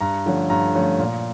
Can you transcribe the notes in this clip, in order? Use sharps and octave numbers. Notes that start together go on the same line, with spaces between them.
G2 A#5
D3 F3 A3 C#4
G2 A#5
D3 F3 A3 C#4
A#2